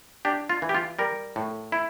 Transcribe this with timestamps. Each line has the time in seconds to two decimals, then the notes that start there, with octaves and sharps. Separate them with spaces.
0.25 D4 G4
0.50 F4
0.62 E3
0.69 G4
0.75 F4
0.99 G3 A#4
1.36 A2
1.72 E4